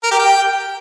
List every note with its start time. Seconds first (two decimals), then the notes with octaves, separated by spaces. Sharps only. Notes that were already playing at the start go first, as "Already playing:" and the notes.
0.04 A#4
0.12 G4
0.20 G5